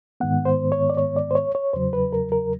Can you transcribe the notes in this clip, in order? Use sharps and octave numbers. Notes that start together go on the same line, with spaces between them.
G#2 D#3 G#3 B3 F#5
C5
C#5
D5
C#5
D5
C5
C#5
C#5
E2 C#3 F#3 C5
B4
A#4
A#4